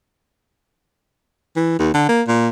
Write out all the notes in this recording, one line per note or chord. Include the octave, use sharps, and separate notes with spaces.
E3
D#2
D3
A#3
A#2